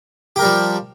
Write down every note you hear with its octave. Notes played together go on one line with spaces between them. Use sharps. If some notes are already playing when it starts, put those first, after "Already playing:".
F3 G3 G4 A#4